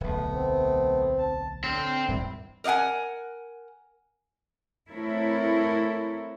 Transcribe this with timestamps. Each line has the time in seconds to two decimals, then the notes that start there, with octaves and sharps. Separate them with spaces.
0.01 D1 B1 A3 B3
0.34 C4
1.18 A5
1.64 D3 C4 F6
2.08 D#1 G#2 G3 E4
2.64 A#4 D5 D#5 F#5 G#5
4.90 A3 C4 E4 A4 A#4 C#5